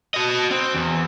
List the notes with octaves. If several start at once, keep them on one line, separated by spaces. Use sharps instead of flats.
F#4 D#5
C4
E2